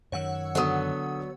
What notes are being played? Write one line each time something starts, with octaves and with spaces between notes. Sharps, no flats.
F#2 D#3 C#5 F#5 E6
D3 F#3 B3 D#6